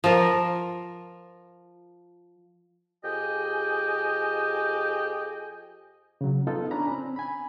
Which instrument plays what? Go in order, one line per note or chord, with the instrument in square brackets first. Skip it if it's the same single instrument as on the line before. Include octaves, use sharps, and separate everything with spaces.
[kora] F3 F4 A#4
[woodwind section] F2 G4 G#4 D#5 G5 G#5
[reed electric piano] C#3 F#3
B3 D#4 F4 A4
C#4 D4 G#5 A#5 B5
C4
G#5 B5